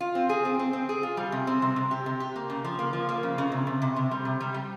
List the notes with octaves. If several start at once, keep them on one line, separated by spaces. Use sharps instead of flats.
F4
C4
G#4
C4
C4
C4
G#4
F4
G3
C3
C4
C3
C3
G4
C3
G4
A#3
C#3
F3
A#3
F3
A#3
C#3
C#3
C3
C3
C3
C3
G3
C3
G3
G3